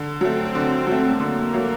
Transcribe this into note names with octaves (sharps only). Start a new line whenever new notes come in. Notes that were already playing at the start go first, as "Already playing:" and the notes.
Already playing: D3
F#3 A3 C4
D3
F#3 A3
D3 A#3
F#3 A3